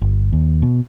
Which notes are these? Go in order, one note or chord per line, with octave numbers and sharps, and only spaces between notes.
G1
D#2
B2